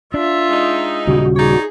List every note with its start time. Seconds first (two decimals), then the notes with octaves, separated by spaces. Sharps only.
0.14 D4 F4 E5
0.50 G#3 D#4
1.07 D#1 C#3 G3 F#4
1.36 D#4 G#4 C#5 D5